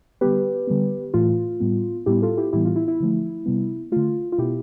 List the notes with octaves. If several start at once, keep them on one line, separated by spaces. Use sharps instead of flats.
D3 G3 B3 G4 B4
D3 G3 B3
A2 E3 A3 F4
A2 G3 B3
A2 G3 B3 E4 G4
F4 A4
E4 G4
A2 E3 G3 B3 E4 G4
F4
E4
E4
D3 F3 A3
C3 G3 B3
D3 A3 F4
F4
B2 B3 E4 G4